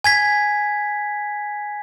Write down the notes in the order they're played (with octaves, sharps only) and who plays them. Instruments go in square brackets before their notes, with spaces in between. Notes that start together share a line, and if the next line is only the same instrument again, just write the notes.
[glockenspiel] G#5 G#6 B6